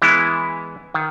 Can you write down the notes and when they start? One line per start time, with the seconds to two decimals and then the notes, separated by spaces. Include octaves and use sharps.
0.02 E3 G#3 B3 E4
0.94 D#3